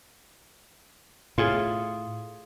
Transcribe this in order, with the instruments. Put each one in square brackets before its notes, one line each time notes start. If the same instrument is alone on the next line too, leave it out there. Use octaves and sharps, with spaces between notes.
[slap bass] A2 [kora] F4 G#4